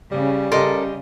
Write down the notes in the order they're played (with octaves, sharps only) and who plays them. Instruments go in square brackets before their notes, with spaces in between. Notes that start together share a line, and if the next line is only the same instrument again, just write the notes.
[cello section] C#3 [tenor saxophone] G3
[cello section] C#3 [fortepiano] G4 D#5 C6 [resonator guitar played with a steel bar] A4 A#4